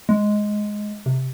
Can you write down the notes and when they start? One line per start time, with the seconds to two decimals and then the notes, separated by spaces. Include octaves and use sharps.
0.09 G#3
1.06 C3